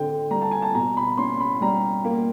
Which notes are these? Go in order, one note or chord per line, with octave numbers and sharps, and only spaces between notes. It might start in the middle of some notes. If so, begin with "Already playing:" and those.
Already playing: D3 C4 G5
G3 A#5
A5
G#5
A5
B2 A#5
B5
C#4 C6
B5
G3 A#5
A#3